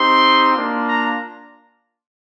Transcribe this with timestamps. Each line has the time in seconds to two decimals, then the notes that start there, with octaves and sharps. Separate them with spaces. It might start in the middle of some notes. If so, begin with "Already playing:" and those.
Already playing: C4 D#4 G4 C6
0.52 A#3 D4 F4
0.86 A#5